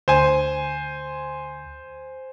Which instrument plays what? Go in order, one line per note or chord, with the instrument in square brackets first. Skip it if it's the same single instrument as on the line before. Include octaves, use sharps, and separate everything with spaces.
[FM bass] D2 [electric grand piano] C5 G#5